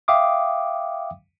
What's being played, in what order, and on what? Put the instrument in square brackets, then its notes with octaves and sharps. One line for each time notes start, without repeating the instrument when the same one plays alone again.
[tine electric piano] E5 F5 G5 D6 D#6